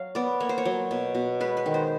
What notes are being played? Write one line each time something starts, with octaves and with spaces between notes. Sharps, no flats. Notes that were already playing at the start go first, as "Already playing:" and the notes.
Already playing: F#3 F5
B3 D5
A#3 C#5
C5
C#5
F#3
B2
B2
G#3 B4
B4
D#3
C5